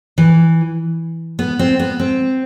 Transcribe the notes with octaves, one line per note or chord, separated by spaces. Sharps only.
E3
B3
C4
B3
C4